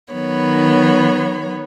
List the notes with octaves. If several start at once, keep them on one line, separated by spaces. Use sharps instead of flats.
D#3 F#3 B3 C#5 B5